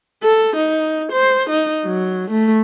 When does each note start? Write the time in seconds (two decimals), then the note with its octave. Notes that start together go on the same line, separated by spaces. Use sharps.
0.23 A4
0.56 D#4
1.12 C5
1.50 D#4
1.85 F#3
2.31 A3